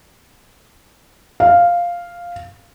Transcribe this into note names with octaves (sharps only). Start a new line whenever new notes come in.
F5